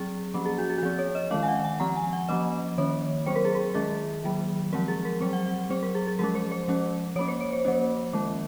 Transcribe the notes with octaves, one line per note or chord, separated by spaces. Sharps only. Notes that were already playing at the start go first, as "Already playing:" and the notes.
Already playing: F#3 C4 G#4
F3 A#3 C#4
G#4
F#4
G#4
F#4
F3 C4 G#4
C#5
D#5
D#3 G#3 C#4 F5
G#5
F#5
G#5
F3 C4 A#5
G#5
F#5
F3 A#3 C#4 D#5
D#3 A#3 C#4 C#5
F#3 C4 C5
A#4
G#4
A#4
D#3 G#3 C#4 G#4
D#3 F#3 A#3
F3 G#3 C4 A#4
G#4
A#4
F#3 C4 C5
F#5
F#5
F#3 C4 C5
A#4
G#4
G#4
F3 G#3 C#4 A#4
C5
C5
F3 G#3 C#4
F3 A#3 C#4 C#5
C5
C#5
C5
F3 A#3 C#4
D#3 G#3 C#4